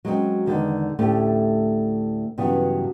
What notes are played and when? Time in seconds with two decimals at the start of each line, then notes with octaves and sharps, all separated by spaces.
0.05 F#3 G#3 A3 C4 C#4
0.46 E2 D3 D#3 G#3
0.99 D2 A2 A3 C#4 G4
2.38 G2 C#3 E3 F#3 B3